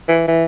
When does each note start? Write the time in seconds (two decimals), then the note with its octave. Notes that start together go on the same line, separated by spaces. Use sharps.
0.08 E3
0.28 E3